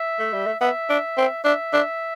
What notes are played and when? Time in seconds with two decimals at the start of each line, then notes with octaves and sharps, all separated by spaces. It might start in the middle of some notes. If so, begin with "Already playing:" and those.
Already playing: E5
0.19 A3
0.33 G3
0.47 A3
0.61 B3 E5
0.90 D4
1.18 C4
1.45 D4 E5
1.73 D4